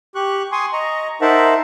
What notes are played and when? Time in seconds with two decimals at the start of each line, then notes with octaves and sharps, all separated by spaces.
0.15 G4 C#6 F#6
0.52 G#5 C6 C#6 D#6
0.73 D#5 A#5 C#6
1.21 D#4 A#4 C5 E5 F#5 A5